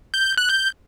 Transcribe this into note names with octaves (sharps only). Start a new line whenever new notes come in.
G6
G6
F#6
G6